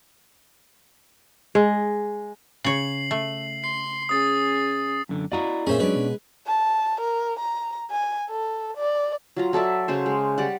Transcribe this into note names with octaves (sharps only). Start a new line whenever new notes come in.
G#3
C#3 C#5 C7 F#7
A3
C6 C7
C#4 G#4 D#6 A6
F#2 D3
E4 F#4 D5 D#5 F5 A#5
A#2 C#4 G#4 C5 E5
F#3 G#3 C#4 D4 B4
B2
A5
A#4
A#5
G#5
A4
D5
F#3 F4 A#5
F#3 A4 D5 E5
C#3 F#3 C#4 C5
G#3
G3 D5 F#5